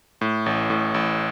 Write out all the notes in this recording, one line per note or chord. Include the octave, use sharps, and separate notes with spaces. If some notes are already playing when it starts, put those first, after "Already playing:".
A2
A1
A2
A1